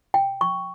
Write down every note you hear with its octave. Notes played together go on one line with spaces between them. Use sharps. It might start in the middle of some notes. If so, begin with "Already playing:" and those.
G5
C#6